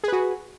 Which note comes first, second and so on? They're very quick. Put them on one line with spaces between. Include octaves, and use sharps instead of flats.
G#4 B4 F#4